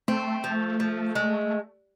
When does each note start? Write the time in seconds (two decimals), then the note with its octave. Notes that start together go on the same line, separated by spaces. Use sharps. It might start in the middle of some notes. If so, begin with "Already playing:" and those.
0.08 A3 C4
0.44 F3
0.80 F3
1.15 G#3